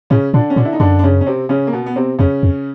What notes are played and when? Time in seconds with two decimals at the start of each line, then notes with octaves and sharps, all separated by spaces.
0.10 A2 C#3 C#4
0.34 A#2 D3 D4
0.50 C#4
0.56 A#2 D3 D4
0.65 E4
0.73 D#4
0.80 F#2 D3 D4
0.99 D4
1.03 C#3 C#4
1.21 C#4
1.26 C3 C4
1.49 C#3 C#4
1.67 A#3
1.73 B2 B3
1.86 B3
1.96 C3 C4
2.19 F2 C#3 C#4
2.43 F2